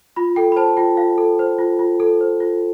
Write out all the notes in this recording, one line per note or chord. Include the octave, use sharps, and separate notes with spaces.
F4 B5
A4 G5
B5
C5 A5
F4 G5
F4 F5
A4
C5
F4
F4
A4
C5
F4